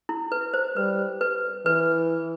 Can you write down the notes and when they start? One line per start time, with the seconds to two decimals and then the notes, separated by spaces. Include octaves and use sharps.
0.09 E4
0.32 B4
0.54 C5
0.76 G3 B4
1.21 B4
1.66 E3 B4